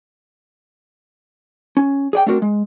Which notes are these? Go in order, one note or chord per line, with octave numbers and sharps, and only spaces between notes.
C#4
G#4 D5 G5
A3 C4 D4 F#4 A#4
G#3